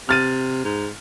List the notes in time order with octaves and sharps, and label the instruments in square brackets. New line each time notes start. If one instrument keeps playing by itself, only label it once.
[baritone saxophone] C3 [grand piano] F6 A6 D#7
[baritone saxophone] G#2